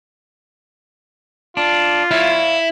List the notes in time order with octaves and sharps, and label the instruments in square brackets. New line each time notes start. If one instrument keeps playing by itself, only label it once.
[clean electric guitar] D4 [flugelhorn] F4
[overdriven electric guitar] E4 [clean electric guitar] C#5 E5 F5